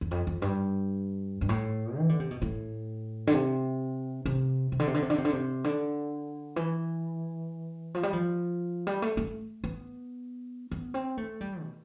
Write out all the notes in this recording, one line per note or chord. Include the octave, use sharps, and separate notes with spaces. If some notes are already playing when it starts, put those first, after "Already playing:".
E2
F2
F2
G2
G2
A2
E3
D3
C3
B2
A2
D3
C3
C3
C3
D3
C3
D3
C3
D3
C3
D3
C3
D3
E3
F3
G3
F3
G3
A3
A3
B3
B3
C4
A3
G3
B2